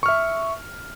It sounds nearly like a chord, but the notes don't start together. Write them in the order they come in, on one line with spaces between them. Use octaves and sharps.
C#6 F6 E5